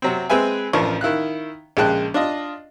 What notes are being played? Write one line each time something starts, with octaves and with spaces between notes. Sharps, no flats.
C3 F#3 C4
G#3 C4 B4 E5 G#5
A1 F3 D4 A#4 C#6
D#3 E4 F5 F#6
A#1 C#3 G#3 G5 A5 F#6
D4 F4 D#5